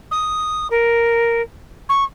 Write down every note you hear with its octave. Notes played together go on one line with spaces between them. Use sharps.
D#6
A#4
C#6